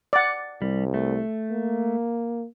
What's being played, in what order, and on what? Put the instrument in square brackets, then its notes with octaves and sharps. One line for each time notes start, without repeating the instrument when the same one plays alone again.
[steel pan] D5 F#5
[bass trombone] C2 [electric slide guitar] G3
[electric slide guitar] A3
[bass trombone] A#3